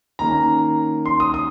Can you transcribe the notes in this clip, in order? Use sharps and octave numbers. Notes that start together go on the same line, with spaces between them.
D#3 A#3 C#4 A#5
C6
D#6
D#6